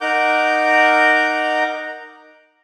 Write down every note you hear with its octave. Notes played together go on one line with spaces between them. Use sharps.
D#4 A#4 F#5 A#5 D6 G6